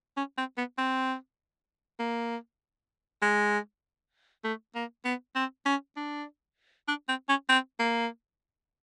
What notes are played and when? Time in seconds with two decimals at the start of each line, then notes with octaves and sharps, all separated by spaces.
0.17 C#4
0.38 C4
0.57 B3
0.78 C4
2.00 A#3
3.22 G#3
4.44 A3
4.75 A#3
5.05 B3
5.35 C4
5.66 C#4
5.96 D4
6.88 D4
7.08 C4
7.29 C#4
7.49 C4
7.80 A#3